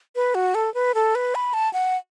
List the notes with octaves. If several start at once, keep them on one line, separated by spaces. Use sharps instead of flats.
B4
F#4
A4
B4
A4
B4
B5
A5
F#5